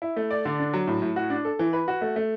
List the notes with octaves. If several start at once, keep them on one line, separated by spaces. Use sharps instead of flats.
E4
A3
D5
D3
D4
F#3
A2
A2
F#4
D4
A4
E3
B4
F#4
A3
A3